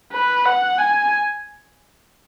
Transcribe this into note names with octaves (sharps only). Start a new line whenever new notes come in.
B4
F#5
G#5